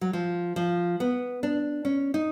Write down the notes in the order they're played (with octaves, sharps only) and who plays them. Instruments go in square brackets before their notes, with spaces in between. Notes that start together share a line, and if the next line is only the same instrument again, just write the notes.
[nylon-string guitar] F#3
F3
F3
B3
D4
C#4
D#4